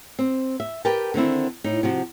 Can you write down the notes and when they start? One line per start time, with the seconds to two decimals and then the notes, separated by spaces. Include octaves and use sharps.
0.19 C4
0.60 E5
0.85 G4 A#4 B4 G5 A5
1.14 D3 D#3 C4 E4
1.64 A2 D#4
1.83 C3 F3 F#4